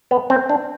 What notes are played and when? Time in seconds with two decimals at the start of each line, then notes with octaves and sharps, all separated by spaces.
0.11 B3
0.30 C4
0.50 D4